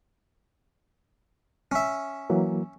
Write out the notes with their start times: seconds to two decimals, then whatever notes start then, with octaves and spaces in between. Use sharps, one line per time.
1.72 C#4 E5
2.30 E3 F#3 A#3